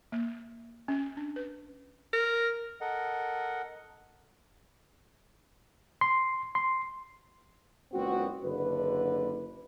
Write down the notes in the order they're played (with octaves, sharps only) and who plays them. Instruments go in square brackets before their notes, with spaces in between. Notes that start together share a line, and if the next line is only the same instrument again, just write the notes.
[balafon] A#3
C#4
D4
B4
[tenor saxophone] A#4
[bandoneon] A4 A#4 D#5 F#5
[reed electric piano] C6
C6
[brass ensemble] F#1 C#2 A#2 B3 C4 F#4
F#1 D3 B4